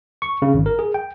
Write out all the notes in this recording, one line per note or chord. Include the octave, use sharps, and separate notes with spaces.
C#6
C#3
G#1
A#4
G#4
G5